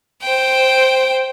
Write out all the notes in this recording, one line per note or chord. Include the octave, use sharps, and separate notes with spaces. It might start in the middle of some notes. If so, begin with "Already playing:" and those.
C5 G5